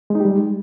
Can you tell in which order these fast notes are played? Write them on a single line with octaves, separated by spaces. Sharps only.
G#3 D#4 G4 G3